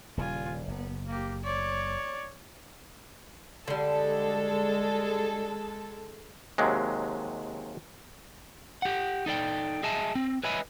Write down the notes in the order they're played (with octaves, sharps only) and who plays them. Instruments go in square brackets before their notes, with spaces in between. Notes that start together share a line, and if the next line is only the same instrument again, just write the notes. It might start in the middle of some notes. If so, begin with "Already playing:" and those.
[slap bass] D#1 C#3 G3 [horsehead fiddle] F4 G#5
[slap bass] F#1 [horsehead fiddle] B3
[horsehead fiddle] A#3 G4
C#5 D5
[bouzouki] D3 G3 [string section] G#3 A4
[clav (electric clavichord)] D#2 C3 F#3 G#3
[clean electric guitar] G4 F#5
D#4 A4 D5 G5
G#4 D#5 E5 G#5 A5
C4
B4 C#5 D#5 E5 G#5 B5